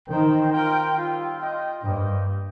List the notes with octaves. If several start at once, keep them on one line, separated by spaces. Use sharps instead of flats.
D#3 C4 D#4 C5 G5
F4 A#4 G5
G3 C4 F4
F4 D#5 G5
G2 A#3 G4 C5 D#5 G5